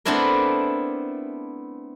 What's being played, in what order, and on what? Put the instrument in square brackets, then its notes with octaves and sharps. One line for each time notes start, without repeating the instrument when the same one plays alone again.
[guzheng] A3 B3 C4 D4 E4 A#4